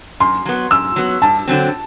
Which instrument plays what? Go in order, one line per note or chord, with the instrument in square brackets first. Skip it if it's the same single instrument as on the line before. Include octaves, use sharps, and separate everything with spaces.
[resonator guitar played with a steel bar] F#2 [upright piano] C6
[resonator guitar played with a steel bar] F#3 B3
[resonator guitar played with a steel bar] F#2 [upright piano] E6
[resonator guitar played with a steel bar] F#3 B3
[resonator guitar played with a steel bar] G2 [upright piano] A5
[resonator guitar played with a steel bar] D3 F#3 C4